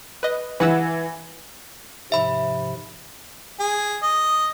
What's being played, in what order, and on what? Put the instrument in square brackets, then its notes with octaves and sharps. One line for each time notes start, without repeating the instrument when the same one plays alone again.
[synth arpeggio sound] B4 D#5
[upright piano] E3 [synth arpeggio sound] B4 F#5 E6
[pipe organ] G#2 C3 F3 [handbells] E5 B5
[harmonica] G#4
D#5